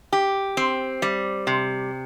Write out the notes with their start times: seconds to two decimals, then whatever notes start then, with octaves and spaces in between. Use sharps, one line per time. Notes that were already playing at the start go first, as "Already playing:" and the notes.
0.12 G4
0.57 C4
1.02 G3
1.47 C3